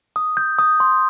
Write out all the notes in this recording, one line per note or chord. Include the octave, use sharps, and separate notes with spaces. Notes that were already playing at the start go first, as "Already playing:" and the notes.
D#6
G6
D#6
C6